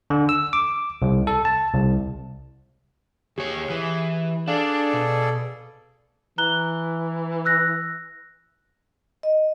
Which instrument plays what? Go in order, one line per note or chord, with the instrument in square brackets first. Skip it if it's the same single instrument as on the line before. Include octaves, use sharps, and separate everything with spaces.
[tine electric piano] D3
E6
D6
C2
A4
A5
C2
[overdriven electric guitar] D#2 C#5 [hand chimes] G4 [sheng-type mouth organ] G#4
[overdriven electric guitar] E3
[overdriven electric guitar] D4 [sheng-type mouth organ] G#4 A4 D5 [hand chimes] F5
[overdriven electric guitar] B2
[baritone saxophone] E3 [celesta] A#5 F#6 G7
[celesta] E6 F#6 A#6
[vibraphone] D#5